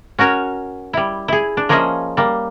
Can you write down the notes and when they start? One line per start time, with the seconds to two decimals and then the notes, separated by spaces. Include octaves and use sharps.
0.19 C#4 F#4 A#4 C#5
0.93 G3 E4
1.28 E4 G#4
1.57 D4
1.69 F3 A#3 C#4 G#4 D#5 E5
2.17 G3 A#3